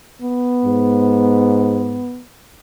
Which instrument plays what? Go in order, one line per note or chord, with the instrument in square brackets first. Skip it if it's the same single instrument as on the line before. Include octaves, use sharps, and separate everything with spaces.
[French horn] B3
[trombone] G#2